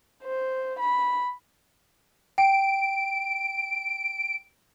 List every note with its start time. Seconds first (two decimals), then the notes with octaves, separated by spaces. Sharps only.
0.24 C5
0.79 B5
2.38 G5 D7